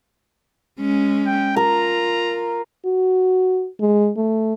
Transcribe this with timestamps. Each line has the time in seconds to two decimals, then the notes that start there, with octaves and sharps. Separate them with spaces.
0.80 G#3 C#4
1.27 G5
1.56 F4 A#4 A#5
2.85 F#4
3.80 G#3
4.17 A3